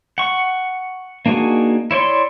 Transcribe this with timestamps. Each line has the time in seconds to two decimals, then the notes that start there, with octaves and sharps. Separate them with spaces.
0.18 F#5 C#6
1.26 A#3 D4 D#4 F#4 G#4
1.91 E4 C#5 D5 C6